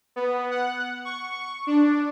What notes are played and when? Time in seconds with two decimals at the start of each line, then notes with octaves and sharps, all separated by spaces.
0.16 B3
0.51 F#5
1.05 C#6
1.67 D4